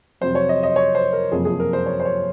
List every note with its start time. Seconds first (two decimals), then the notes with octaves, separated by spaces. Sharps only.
0.21 F2 C3 F#3 C5
0.35 C#5
0.49 D#5
0.63 D#5
0.76 C#5
0.95 C5
1.13 A#4
1.32 F#1 F2 C3 F3 G#4
1.45 G#4
1.60 A#4
1.73 C5
1.86 C#5
2.00 C5
2.05 C#5